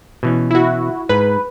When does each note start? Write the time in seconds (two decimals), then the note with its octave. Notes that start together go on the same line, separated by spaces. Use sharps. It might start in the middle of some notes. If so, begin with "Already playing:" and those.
0.23 B2 E3 C#4
0.51 E4 F#4
1.09 G#2 B4